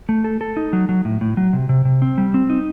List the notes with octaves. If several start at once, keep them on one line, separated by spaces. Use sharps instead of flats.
A3
A4
A4
D#4
F#3
F#3
A2
A2
F#3
C3
C3
C3
C4
G3
C4
D#4